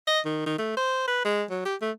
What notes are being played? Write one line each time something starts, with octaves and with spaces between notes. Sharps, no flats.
D#5
D#3
D#3
A3
C5
B4
G#3
F#3
G4
A3